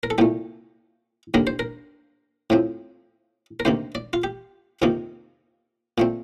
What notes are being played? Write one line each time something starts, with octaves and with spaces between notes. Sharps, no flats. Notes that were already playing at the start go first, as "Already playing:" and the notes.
A#4
A4
C2 A#2 A3 G4
D#2 D3 G3 A#3 A#4
C5
A#4
A2 F3 C4
A#4
D2 C3 D#3 A#3 C5
D5
F4
G4
F2 C3 D#3 A#3
A#2 A3 C4